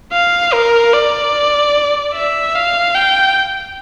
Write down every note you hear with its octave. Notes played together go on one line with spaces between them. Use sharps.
F5
A#4
D5
E5
F5
G5